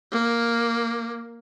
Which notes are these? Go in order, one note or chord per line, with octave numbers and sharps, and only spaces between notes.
A#3